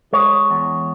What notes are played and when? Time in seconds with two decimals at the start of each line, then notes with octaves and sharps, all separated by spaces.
0.13 G#3 C#5
0.50 E2